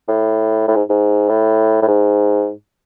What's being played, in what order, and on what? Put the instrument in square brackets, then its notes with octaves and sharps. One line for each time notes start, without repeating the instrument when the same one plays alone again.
[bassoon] A2
A2
G#2
G#2
A2
A2
G#2